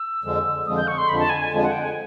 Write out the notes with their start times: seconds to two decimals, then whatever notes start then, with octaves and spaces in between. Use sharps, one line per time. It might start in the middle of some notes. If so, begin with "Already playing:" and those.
Already playing: E6
0.24 F2 D3 F3 G#3
0.66 F2 D3 F3 G#3 D#6
0.77 G6
0.87 C#6
0.98 C6
1.08 F2 D3 F3 G#3 B5
1.19 A5
1.29 G#5
1.40 G#5
1.51 F2 D3 F3 G#3
1.61 F#5
1.72 G5
1.82 G#5